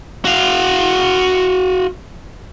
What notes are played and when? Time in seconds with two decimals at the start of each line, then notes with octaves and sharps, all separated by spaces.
0.25 F#4 F5